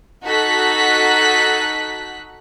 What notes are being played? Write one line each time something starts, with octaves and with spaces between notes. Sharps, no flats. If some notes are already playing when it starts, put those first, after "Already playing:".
D#4 F#4 A4 F#6 B6